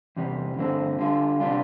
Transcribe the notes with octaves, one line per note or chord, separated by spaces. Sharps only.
E2 C3 G3
G2 D3 A3 C4
D3 G3 D4 F4
C3 G3 D4 F4